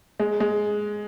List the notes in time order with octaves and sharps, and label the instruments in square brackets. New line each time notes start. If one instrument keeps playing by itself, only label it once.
[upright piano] G#3
G#3